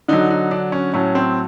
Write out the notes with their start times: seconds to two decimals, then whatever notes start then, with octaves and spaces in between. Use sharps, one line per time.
0.08 D3 F#3 D#4
0.30 D#4
0.51 D4
0.72 C#4
0.94 A2 F#3 C#4
1.15 C4